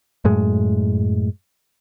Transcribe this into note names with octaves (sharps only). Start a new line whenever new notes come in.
F#2 A2 G#3